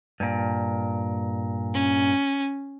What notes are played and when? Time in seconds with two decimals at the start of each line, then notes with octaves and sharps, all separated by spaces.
0.20 G2 A#2
1.74 C#4